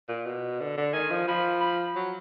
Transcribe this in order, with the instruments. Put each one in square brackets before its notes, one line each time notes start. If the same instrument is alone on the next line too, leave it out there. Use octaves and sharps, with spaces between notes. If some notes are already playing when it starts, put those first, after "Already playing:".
[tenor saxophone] A#2
B2
D3
D3
[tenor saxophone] D#3 [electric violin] G#5
[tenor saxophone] F3
[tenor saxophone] F3 [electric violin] B5
[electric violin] B5
[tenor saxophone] F#3